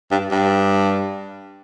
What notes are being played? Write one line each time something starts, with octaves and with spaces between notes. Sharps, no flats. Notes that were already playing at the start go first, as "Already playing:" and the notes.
G2
G2